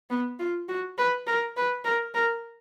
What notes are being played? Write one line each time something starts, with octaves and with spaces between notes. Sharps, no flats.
B3
F4
F#4
B4
A#4
B4
A#4
A#4